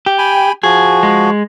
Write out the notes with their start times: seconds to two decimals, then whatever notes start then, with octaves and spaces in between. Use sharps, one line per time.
0.06 G4
0.18 G5 G#5 B5
0.63 F3 F#4 G#4
1.03 G#3